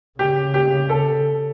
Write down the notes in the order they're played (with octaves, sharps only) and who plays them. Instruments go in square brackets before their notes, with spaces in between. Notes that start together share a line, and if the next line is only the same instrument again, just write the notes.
[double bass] C#3 [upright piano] G4
[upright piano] G4
A4